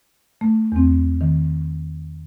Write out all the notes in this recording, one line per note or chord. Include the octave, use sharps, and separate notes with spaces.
A3
E2 C4
D#3